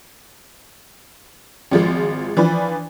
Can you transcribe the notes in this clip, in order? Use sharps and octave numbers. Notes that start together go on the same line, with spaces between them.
G#1 F3 G#3
E3 F3 D4 B4